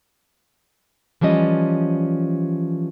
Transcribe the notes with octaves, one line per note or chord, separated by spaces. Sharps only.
E3 F3 G3 C#4 D#5